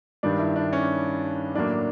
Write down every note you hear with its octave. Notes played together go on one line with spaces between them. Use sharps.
G2 D#3 G3 D4
E4
D4
C#4
A2 F#3 A#3 D4